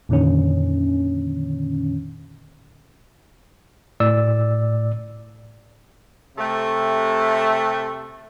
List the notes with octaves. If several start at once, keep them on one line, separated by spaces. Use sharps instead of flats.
F2 A#2 D3 D#3 C#4
A2 D5 E6
C3 A3 E5